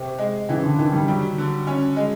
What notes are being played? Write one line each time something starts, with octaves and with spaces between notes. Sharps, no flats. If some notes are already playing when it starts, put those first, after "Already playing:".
Already playing: C3
G#3
C#3 E3
D3
D#3 E3
G3
F#3 G3
D3
C#4
G#3